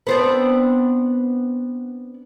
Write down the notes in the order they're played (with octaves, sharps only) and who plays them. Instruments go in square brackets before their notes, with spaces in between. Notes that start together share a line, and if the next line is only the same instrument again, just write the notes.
[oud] B3 C4 D4